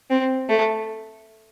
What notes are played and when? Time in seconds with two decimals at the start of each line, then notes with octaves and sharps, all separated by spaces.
0.10 C4
0.49 A3